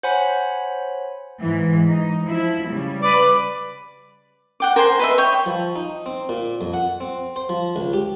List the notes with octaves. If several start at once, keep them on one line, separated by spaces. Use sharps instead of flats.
C5 C#5 F#5 G#5 B5
G#2 E3
D#4
F3 E4
C#3 G3
B4 D5
F#5 G5 D6
A#4 C5 G#5 C6
B4 D#5 E5
C#5 G5
F3
D#4
C4
A#2
F2
F#5
C4
C5
F3
C#2
G4